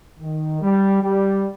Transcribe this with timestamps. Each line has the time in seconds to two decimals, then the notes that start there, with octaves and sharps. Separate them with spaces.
0.20 D#3
0.61 G3
1.02 G3